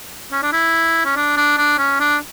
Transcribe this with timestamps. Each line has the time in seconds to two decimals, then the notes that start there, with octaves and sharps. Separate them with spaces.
0.32 C#4
0.43 D4
0.53 E4
1.05 C#4
1.16 D4
1.37 D4
1.58 D4
1.78 C#4
2.00 D4